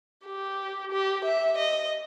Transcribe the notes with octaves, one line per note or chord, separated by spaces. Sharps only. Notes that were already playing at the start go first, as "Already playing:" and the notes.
G4
G4
E5
D#5